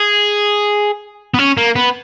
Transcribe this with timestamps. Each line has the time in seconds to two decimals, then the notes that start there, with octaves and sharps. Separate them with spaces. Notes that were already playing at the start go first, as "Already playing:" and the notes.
Already playing: G#4
1.34 B3
1.39 C#4
1.58 A#3
1.76 B3